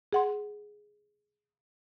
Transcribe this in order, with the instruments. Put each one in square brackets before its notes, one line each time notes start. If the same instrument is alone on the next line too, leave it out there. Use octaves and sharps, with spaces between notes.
[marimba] G#4 F#5 C6